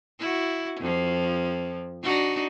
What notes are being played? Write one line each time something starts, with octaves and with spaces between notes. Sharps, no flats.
E4 F#4
F2 F3
D4 D#4 F#4